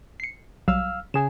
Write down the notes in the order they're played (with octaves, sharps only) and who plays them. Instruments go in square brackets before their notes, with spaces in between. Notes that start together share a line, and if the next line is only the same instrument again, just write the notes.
[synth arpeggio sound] C7 C#7
[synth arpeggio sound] B1 F#3 G3 [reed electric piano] F5 E6 F6
[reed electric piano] C#3 G#4 G#5 [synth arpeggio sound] E7